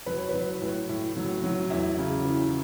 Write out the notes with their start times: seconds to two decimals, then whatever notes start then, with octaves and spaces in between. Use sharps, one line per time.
0.06 F#3 B4
0.18 C#5
0.29 F#3 B4
0.62 A2
0.89 A2
1.17 F#3
1.44 F#3
1.70 E2 E4
1.99 C#3
2.25 E3